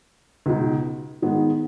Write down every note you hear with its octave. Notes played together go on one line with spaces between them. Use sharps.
C#2 B2 G#3 D#4
G#2 D#3 G#3 B3